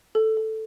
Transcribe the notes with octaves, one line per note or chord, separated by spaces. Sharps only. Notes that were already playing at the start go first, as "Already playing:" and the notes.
A4
A4